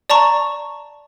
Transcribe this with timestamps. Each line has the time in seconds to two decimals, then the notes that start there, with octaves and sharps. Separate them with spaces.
0.10 D5 A5 A#5 C#6